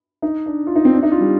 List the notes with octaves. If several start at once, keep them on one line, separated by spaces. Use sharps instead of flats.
D#4
D4
F4
D#4
C4
D4
D#4
F4
G3